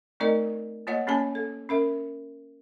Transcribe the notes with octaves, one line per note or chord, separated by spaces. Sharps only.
A3 C4 D#4 A#4 D5 D#5
A#3 F4 C#5 D#5 F#5
A#3 C#4 G4 C#5 G#5 A5
A4
C#4 A#4 E5